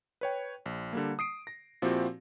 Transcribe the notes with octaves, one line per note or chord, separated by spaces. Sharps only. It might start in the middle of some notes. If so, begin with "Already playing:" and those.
B4 C#5 G5
A#1
D3 G3 A#3
D#6 C7 D7
A#6
A#2 F3 C4 E4 F#4 G4